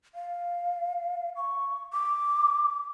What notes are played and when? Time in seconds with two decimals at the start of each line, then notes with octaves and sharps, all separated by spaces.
0.15 F5
1.36 C#6
1.93 D6